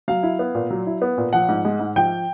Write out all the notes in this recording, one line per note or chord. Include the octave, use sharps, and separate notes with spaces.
F#3 F5
E4
B3
A#2
F#3
E4
B3
A#2
F3 F#5
G#2
G#3
G#2
F3 G5